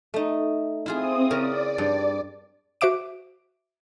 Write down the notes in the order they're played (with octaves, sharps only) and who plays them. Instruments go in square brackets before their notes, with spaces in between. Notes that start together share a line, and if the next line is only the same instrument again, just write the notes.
[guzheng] A3 D#4
[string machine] C4 D#6 [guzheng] E4 F4 G#4
[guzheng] C#3 A#4 [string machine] D5
[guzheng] G2
[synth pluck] F#4 C5 E5 D6 D7